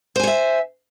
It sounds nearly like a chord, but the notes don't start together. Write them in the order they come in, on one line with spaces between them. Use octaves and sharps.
C5 G#5 C#5 E5